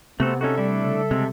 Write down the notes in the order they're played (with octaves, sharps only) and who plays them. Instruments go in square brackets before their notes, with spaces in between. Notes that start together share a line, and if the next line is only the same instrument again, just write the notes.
[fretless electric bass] C3 [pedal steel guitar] A3 F#4 A4 [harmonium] B3 C4
[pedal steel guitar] C#4 D#4 F#4 [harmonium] A4 E5
[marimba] G3 D5 [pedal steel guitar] A3 D4 E4
[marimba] C#3
[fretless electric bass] C3 [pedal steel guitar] G#3 C4